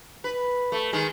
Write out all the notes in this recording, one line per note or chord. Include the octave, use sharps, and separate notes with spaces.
B4
A3
D#3 G#3